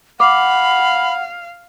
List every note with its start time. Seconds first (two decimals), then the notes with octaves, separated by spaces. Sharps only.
0.20 F5 F#5 B5 D6